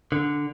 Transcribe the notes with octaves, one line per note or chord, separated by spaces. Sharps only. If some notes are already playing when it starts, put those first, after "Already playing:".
D3